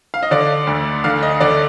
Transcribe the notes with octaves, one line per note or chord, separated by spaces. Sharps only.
F5
D#5
D3 D5
D2
D3 F5
D#5
D3 D5